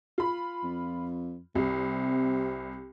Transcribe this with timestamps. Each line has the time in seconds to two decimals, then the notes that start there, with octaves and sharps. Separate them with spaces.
0.18 F4 B5
0.63 F2
1.55 C2 C3